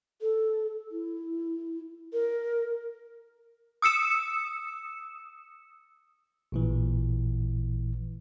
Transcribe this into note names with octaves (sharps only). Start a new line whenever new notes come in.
A4
E4
A#4
D#6 E6 C#7 E7
A1 A#2 E3